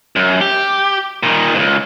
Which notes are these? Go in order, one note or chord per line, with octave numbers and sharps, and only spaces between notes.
F#2
G4
A#2 D#3
C#2 G#2